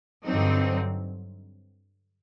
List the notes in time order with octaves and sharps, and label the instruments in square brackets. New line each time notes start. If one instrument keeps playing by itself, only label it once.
[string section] G2 D3 F#3 C4 D#4